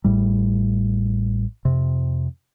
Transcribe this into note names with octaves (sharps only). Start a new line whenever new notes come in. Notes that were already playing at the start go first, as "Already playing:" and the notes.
A1 A2 G3
F2 C3